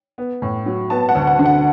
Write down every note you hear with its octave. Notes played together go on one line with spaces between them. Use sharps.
B3
A2
F#3
B3 A5
F#5
D2
F#5
D3
F#5